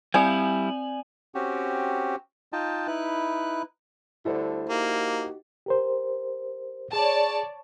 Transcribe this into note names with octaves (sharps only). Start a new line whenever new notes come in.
G3 C4 E4 D5 G#5 F#7
C4 C#4 F#4 G4
D#4 F4 D#5 G5 A5
D#4 E4 B4 F#6
D2 D3 G3 E4 A4 C5
A#3 D#4 F#4 G4
G4 A#4 C5
G#4 C#5 D5 A5